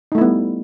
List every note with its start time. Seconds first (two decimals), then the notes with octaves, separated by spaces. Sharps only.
0.12 D#4
0.15 A3
0.18 E4
0.21 B3
0.24 G3